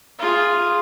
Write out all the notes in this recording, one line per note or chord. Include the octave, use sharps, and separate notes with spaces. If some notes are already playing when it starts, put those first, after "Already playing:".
F4 G#4